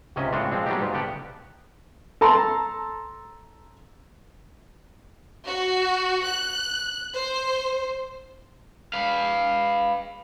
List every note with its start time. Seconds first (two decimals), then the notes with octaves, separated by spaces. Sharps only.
0.16 C#2 G#2 C3 C#4 D#5 E5
0.33 A2 G#3 C4 D4 F4 F#4
0.51 F3 G#3 C4 D4
0.66 F#3 G3 B3 D4 D#4 G4
0.81 G#2 F4
0.93 D3 B3 G4 F#5 A5
2.21 A4 A5 A#5 C6
5.47 F#4
6.25 F#6
7.17 C5
8.93 B4 F5